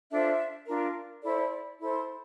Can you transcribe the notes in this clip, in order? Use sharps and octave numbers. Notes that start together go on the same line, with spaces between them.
D4 F4 A4 C5 E5
D4 F4 A#4
E4 A4 C5 D5
E4 A4 C5